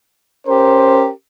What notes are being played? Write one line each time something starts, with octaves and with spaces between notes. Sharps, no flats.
C#4 G4 A#4 C5